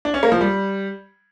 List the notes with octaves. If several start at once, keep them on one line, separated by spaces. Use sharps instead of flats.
D4
C#4
A#3
F3
G3